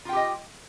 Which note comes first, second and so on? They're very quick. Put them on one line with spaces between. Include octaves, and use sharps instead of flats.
F4 G5 G4 D#5